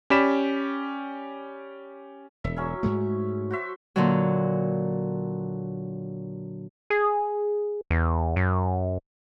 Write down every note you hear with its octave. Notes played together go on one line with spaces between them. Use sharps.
C#4 G4 D5 B5 B6 E7
E1 E5
F#3 C#4 E4
G#2 G#3 A3
F#4 C5 E5
A#2 D3 F#3
G#4
E2
F#2